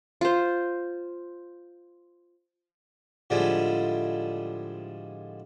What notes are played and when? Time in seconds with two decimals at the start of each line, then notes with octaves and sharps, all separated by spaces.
0.21 F4 C5
3.30 A2 D3 F3 G3 G#3